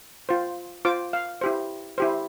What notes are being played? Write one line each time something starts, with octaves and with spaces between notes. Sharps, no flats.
F4 C5
F4 C5 D6
F5
E4 G4 C5
E4 G4 C5